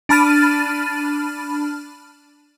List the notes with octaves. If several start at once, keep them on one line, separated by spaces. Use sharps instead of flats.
D4 A5 B5 F6 A6 D#7